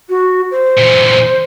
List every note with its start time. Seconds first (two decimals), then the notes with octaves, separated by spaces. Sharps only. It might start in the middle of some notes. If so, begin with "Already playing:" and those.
0.09 F#4
0.51 C5
0.78 A#2 E3